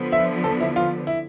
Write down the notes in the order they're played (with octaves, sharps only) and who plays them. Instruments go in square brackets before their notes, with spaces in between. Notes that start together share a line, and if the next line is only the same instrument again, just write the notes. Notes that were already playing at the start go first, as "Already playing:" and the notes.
Already playing: [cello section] D3 F3 B3
[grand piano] E5
A4
E4
F4
E4